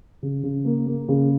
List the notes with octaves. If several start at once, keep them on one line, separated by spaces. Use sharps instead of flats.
C#3
C#3
A#3
A#3
C#3